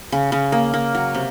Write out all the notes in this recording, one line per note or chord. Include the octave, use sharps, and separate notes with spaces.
C#3
C#3
A#3
A#3
F#3
C3